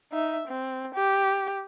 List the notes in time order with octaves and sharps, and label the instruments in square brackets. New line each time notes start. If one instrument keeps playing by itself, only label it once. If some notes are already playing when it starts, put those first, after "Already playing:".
[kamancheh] D#4 E5
C4
G4